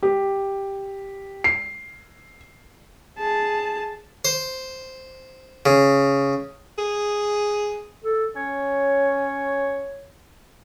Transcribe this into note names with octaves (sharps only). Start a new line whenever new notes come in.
G4
C7
G#4 A5
C5
C#3
G#4
A4
C#4 C#5